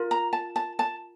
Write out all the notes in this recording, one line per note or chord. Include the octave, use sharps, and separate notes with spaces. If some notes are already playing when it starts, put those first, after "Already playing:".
Already playing: F4 A#4
A#5
A5
A5
A5